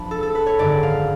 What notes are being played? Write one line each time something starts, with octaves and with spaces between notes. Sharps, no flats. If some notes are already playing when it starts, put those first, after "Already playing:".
Already playing: F3 D4 B4
A4
A4
B4
C#5
G#1 F#2 D3 D5
F5